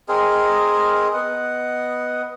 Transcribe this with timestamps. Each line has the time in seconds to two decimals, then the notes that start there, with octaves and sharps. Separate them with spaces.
0.09 C4 G#4 A#4 D#5
1.13 B3 D#5 F#5